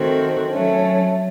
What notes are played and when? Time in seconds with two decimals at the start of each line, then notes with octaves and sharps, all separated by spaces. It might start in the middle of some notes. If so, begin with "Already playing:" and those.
Already playing: D#3 A3 C4 F#4
0.51 F#3 A3 C#4